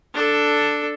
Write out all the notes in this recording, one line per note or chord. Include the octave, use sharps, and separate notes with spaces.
D4 A4